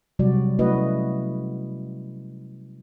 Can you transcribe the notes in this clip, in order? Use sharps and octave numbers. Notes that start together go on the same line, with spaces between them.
C3 F#3 G3 F#4 D5
A3 C#4 E4 F#4 B4 D#5